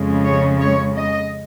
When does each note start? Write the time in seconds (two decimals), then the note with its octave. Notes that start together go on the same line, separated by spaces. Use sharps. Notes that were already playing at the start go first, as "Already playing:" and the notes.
Already playing: F2 C#3 G#3
0.24 C#5
0.60 C#5
0.98 D#5